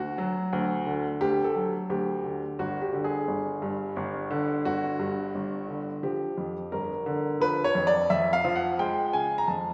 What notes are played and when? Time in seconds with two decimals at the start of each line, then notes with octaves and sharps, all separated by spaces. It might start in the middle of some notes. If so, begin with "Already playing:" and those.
Already playing: D2 F#4
0.18 F#3
0.53 D2
0.86 D3
1.21 D2 G4
1.44 A4
1.55 F#3
1.89 D2 G4
2.24 D3
2.59 G1 F#4
2.81 G4
2.93 D3
3.04 G#4
3.28 G1
3.62 G2
3.96 G1
4.31 D3
4.65 G1 F#4
4.99 G2
5.35 G1
5.68 D3
6.03 F3 G4
6.38 F2
6.72 G1 A#4
7.06 D3
7.40 F3 B4
7.64 C#5
7.75 F2
7.87 D5
8.10 F2 E5
8.33 F5
8.45 F3
8.56 F#5
8.79 G#3 G5
9.13 C#3 G#5
9.38 A#5
9.47 F2 A5